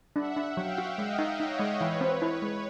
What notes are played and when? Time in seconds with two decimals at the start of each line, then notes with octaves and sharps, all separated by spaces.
0.15 D4 E5 F#5
0.37 D4
0.56 F#3 F5 G5
0.78 F#4
0.98 G#3 D#5 F5
1.19 D#4
1.39 D#4 C#5 D#5
1.59 G#3
1.80 E3 B4 C#5
2.01 C4
2.22 E4
2.42 G#3